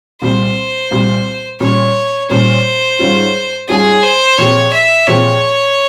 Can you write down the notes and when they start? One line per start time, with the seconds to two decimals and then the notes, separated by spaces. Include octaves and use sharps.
0.22 C2 A#2 G3 C5
0.91 C2 A#2 G3
1.60 A#2 G3 C#4 C#5
2.29 A#2 G3 C#4 C5
2.99 G#2 G3 C#4 F4
3.69 G#2 G3 C#4 F4 G#4
4.03 C5
4.38 A#2 F3 G#3 C4 G4 C#5
4.73 E5
5.08 A#2 F3 G#3 C4 G4 C#5